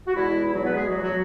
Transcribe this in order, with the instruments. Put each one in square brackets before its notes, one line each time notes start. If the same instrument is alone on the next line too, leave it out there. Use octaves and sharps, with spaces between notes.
[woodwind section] F#4
E2 B2 G#3 E4
E4
F#3 F#4
B3 B4
G#3 G#4
F#3 F#4
F#3 F#4